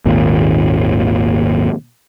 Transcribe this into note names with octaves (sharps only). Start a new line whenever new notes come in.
G#1 D#2 A#2